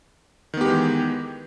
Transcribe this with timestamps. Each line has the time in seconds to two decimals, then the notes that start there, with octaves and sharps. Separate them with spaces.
0.54 D#3
0.57 B3
0.61 G4
0.65 G#3
0.68 E3